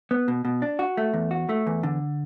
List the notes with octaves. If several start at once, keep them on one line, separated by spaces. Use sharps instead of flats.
B3
B2
B2
D4
F#4
A3
E2
F#4
A3
E2
D3